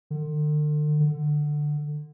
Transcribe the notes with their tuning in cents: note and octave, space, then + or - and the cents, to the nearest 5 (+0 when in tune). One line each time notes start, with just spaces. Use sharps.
D3 +40
D3 +15